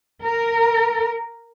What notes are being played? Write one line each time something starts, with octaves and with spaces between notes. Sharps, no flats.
A#4